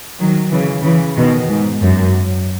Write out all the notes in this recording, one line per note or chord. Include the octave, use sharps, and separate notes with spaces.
D#3 F#3
C#3 E3
C#3 E3
B2 D#3
G#2
F#2